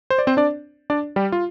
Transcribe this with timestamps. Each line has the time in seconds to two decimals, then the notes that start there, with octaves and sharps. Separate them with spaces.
0.10 C5
0.19 D5
0.27 C4 C5
0.37 D4 D5
0.90 D4 D5
1.16 G3 G4
1.32 F4